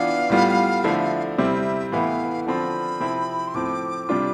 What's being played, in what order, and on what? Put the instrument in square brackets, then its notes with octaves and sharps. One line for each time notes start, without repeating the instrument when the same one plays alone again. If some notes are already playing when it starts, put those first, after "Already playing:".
Already playing: [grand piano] E3 B3 D4 F4 [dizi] F5
[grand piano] A2 G3 B3 F4
D3 F3 A3 E4
[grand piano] C3 G3 C4 E4 [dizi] E5
[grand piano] A2 E3 B3 E4 [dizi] F5
[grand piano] D3 F3 C4 F4 [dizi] B5
[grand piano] C3 F3 C4 E4
[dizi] C6
[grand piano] A2 F3 C4 [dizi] D6
[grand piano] C3 G3 D4 F4